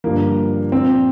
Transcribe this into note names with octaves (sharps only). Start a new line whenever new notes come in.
G2 D3 F3 A#3
A#2 F3 C4